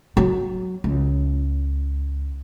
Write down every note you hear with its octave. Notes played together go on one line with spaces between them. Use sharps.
F#3
C#2